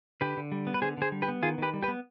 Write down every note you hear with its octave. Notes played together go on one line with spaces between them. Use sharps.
D3 G4 B4
D3
G3
B3
B4
D3 G#4 C5
D3 G#4 C5
G3
G4 B4
B3
D#3 F4 G#4
D#3 G4 B4
G3
G4 B4
B3